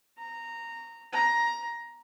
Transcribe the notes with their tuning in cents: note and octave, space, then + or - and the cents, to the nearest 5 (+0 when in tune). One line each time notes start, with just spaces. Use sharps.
A#5 -15
A#5 +15